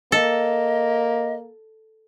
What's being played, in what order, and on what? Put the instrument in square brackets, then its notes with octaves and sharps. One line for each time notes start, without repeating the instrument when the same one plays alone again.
[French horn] A#3 [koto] A4 [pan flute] D#5